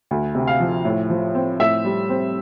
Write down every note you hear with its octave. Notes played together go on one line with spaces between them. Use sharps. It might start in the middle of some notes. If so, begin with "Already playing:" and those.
D2
C3
F5
F3
A2
F3
C4
A2 E5
G3
C4